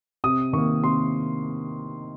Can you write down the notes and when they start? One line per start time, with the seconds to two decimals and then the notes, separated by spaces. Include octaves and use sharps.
0.24 C3 D#6
0.53 D#3 C#6
0.58 A#3
0.83 C3 C6